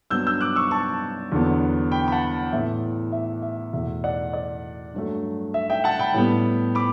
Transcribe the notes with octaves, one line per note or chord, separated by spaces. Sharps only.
G2 F#3 B3 E6 G6
E6 G6
D6 F#6
C#6 E6
A5 C#6
E2 D3 F#3 B3
G5 B5
B5
F#5 A5
A2 E3 B3 E5
E5
E5
E2 B2 A3 E5
D5 F#5
D5
G2 F#3 A3
E5
E5 G5
F#5 A5
G5 B5
A2 G3 B3
B5 D6